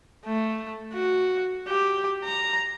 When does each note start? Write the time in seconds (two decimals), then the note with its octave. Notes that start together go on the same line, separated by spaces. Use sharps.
0.26 A3
0.94 F#4
1.68 G4
2.25 A#5